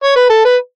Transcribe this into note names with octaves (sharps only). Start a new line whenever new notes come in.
C#5
B4
A4
B4